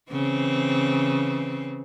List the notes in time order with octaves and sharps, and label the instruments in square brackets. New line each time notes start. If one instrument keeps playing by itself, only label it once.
[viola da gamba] C#3 E3 C4